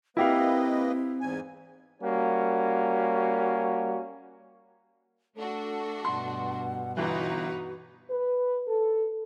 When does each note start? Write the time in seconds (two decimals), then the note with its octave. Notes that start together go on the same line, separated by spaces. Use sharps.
0.17 A#3 C4 E4 G4 B4 D#5 F5
1.21 E2 G#2 G#5
2.01 G3 A#3 C#4 F#4
5.36 A3 D4 F#4 A4
6.05 G2 B2 F#5 C6
6.97 G1 E3 D#4 F#4 B4
8.10 B4
8.67 A4